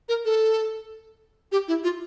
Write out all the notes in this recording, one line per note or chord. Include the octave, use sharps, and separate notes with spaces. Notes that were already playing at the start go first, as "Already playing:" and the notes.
A#4
A4
G4
E4
F4